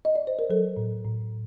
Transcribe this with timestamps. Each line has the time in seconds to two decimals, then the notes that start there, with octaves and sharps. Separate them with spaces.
0.05 D#5
0.15 D5
0.27 C5
0.39 A#4
0.50 F#3 A4
0.77 A2
1.05 A2